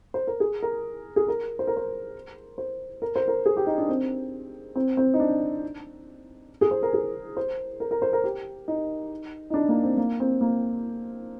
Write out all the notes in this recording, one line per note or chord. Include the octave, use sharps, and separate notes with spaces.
C5
A#4
G#4
A#4
G#4
A#4
C5
A#4
C5
C5
A#4
C5
A#4
G#4
G4
D#4
D4
C4
C4
C4
D#4
D4
G#4
C5
A#4
G#4
C5
A#4
A#4
C5
A#4
G4
D#4
D#4
D4
A#3
C4
A#3
C4
A#3